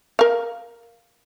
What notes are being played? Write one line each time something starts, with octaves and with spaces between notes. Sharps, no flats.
A#4 F5